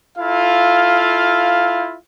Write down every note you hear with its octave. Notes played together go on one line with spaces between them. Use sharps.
E4 F4 A4 F5